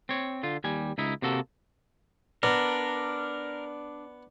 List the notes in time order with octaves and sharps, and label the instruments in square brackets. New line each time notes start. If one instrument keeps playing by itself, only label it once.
[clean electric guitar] C4 C#5
D3 F4
D#2 G3 G#5
C#2 D#4 E4
C3 A#3 F#4 A4
[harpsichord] B3 [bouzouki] D4 [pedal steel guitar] A#4